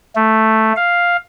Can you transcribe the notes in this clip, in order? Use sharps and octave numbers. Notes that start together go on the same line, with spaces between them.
A3
F5